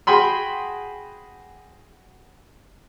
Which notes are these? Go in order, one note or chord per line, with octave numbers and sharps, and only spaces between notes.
F#4 G#4 G5 B5 C6